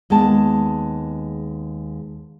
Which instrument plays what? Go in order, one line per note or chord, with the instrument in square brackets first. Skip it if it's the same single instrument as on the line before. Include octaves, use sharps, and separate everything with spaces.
[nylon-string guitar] D#2 G#3 B3 A5